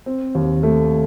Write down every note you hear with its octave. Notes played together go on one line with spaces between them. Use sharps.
C4
D#2
A3